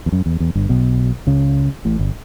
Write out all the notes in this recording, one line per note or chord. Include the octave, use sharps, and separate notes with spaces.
E2
F#2
E2
E2
G1 G2
B1 B2
C#2 C#3
A1 A2
G1